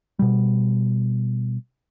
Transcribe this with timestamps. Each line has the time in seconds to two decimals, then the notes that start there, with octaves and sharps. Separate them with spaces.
0.19 B2 G3